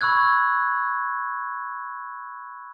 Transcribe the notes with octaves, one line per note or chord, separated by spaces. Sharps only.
B5 C#6 E6 F#6 G#6